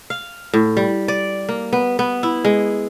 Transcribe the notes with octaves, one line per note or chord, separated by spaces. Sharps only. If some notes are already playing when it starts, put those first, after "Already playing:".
F5
A2
G3
D5
A#3
B3
B3
E4
G#3